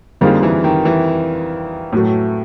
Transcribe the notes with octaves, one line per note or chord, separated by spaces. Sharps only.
F2 D3 F3 G3 A#3 D#4 G#4
E3
D#3
E3
A2 F#3 A3